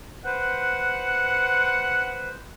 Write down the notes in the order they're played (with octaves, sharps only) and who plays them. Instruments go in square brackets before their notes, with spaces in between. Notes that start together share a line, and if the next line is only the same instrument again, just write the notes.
[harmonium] B4 C5 [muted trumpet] F#5